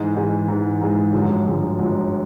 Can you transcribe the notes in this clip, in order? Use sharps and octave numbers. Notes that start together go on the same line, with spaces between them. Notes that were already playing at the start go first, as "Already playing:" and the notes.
Already playing: G#2 E3 G#3
G#2 E3 G#3
G#2 E3 G#3
G#2 E3 G#3
G1 F#2 D3 F3 G#3
G1 F#2 D3 F3 G#3
G1 F#2 D3 F3 G#3